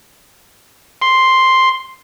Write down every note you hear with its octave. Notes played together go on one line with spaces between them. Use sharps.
C6